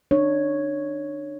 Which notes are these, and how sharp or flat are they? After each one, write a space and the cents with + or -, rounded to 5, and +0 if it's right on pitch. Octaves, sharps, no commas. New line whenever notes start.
D4 +35 C#5 +0